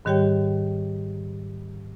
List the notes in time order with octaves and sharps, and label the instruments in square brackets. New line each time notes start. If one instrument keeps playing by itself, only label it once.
[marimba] G#2 D#3 G3 G4 C#5 G5